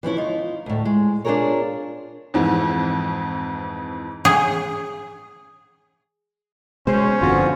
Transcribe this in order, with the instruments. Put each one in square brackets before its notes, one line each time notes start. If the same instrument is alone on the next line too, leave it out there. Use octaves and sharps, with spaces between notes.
[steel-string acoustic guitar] E3 F3 C#4 E4
D#4 F4
D2 A2
G#3
D4 F4 F#4 G#4 A#4 C#5
[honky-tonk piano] F2 G#2 E3
[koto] G#4
[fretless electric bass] B2 G#3 [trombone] C#4 [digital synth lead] C5
[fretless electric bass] G1 F2 B2 [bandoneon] D3 F4 F#4